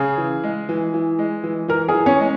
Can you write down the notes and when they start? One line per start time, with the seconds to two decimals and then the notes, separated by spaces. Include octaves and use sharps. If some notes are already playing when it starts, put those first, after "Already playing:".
Already playing: C#3 G#4
0.18 E3
0.43 G#3
0.69 E3
0.94 E3
1.19 G#3
1.44 E3
1.68 E3 A#4
1.88 G#4
1.94 E3
2.06 C#4
2.20 G#3